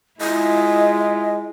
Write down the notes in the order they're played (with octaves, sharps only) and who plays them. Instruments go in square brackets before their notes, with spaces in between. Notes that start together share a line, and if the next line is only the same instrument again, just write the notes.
[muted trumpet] G#3 [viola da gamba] E4 F4 [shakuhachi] D#5